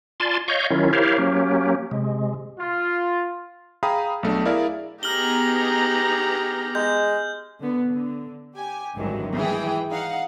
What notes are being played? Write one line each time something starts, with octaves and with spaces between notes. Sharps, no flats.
F4 D5 G#5 A5 C6
C#5 D#5 F5 C#6 G6
D#3 F#3 C#4 E4 F4
E4 G4 A#4 C5 C#5 F5
F#3 A#3 C#4 G4
C3 G#3
F4
G#4 F5 G5 A#5 B5 D#6
B1 A3 D4
E4 G#4 A#4 D5 E5 F5
B3 D#4 G4 G#4 A#5 F6 F#7 G7
G#3 G6
D3 B3
D3
G4 G#5
G#1 D2 G2 D#3 E3 F#3
E3 G#3 G#4 G5
D#4 F5 F#5